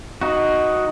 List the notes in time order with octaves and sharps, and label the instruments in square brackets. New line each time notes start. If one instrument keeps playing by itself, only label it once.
[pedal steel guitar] D#4 F#4